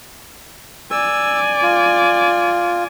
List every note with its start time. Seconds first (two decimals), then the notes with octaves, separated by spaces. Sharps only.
0.91 D5 G#5 E6
1.62 F4